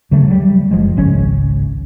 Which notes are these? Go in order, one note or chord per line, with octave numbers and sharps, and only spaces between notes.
D2 C#3 F#3 A3
F#3 G3
F#1 F3 G#3
G#1 C#2 C#3 C#4